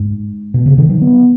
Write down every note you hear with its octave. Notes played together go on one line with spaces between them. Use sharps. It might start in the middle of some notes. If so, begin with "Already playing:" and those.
Already playing: G#2
B2
C#3
D#3
F#3
B3